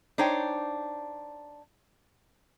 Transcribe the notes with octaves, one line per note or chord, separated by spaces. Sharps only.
D4 D#4 C5 C#5 G5